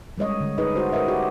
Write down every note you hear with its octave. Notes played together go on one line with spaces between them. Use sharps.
G3 G#3 C#5 D#5
D3
D#4 G#4 B4 D#5
F#4 C5
A#4 B4 C#5 D#5 E5
F#4 G4